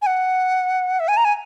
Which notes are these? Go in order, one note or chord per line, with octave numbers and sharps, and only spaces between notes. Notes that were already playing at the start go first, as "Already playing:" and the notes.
G#5
F#5
E5
G#5
A#5
G#5